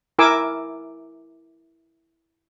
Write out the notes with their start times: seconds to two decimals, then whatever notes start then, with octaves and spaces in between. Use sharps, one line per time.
0.19 E4 A#4 G#5 D6 E6